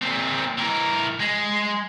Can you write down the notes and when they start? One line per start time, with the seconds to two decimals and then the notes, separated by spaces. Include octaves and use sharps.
0.02 A#2 C4
0.58 E3 A#4
1.20 G#3